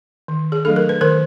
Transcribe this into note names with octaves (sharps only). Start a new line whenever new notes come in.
D#3
G#4
F#3 A3 D4 A4
A#4
B4
D#3 A#4 C5